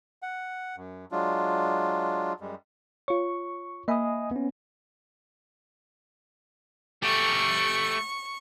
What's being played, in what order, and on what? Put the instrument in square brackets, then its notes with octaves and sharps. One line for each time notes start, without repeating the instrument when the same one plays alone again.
[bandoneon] F#5
F#2
F#3 G#3 D4 F4
F#2 G3 G#3
[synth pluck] F4 C#5 [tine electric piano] C#6
[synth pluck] A#3 E5 B5 [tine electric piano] D#5 G#5 D#6
[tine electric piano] B3 C#4
[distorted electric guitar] A3 G4 [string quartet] C#6